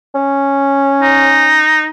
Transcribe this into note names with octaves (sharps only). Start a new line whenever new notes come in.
C#4
D#4